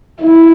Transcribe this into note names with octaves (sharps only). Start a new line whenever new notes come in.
E4